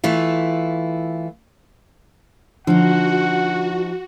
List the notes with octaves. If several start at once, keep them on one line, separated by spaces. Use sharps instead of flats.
E3 A3 E4 F4
D3 F3 D#4 F#4 F#5